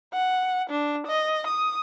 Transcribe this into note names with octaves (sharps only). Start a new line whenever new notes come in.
F#5
D4
D#5
D#6